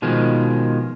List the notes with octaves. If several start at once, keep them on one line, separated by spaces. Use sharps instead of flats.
B2 D#3 F3 G#3